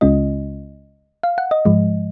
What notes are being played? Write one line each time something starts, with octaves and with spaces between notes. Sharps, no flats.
C#2 C#3 G#3 C#4 F4 D#5
F5
F#5
D#5
G#2 F3 G#3